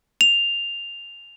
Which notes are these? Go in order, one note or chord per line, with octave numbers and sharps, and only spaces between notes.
F7